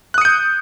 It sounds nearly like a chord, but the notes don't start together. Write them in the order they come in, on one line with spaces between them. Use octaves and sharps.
F#6 D#6 C#7 G6